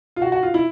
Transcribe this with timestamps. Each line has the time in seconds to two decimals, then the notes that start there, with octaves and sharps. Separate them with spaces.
0.16 F4
0.22 F#4
0.32 F#4
0.43 F4
0.54 E4